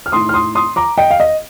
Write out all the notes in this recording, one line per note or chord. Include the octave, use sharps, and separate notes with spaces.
F6
A2 A3 D#4 C6 D#6
F6
C6 D#6
C6 D#6
A#5 D6
D#5 G5
F5
D#5